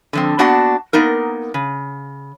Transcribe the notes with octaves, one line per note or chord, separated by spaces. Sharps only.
D3 F3 C4
A#3 B3 D4 F#4 F#5 A5
A#3 B3 D#4 A#4
C#3